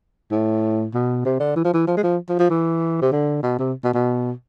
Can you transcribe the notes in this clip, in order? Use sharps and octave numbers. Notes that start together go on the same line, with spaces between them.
A2
B2
C3
D3
E3
F3
E3
F3
G#3
F3
F3
F3
E3
C3
D3
B2
C3
B2
B2